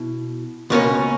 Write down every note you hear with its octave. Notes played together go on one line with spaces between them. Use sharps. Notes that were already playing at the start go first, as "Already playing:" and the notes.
Already playing: B2 E4
C#2 B2 A#3 C#4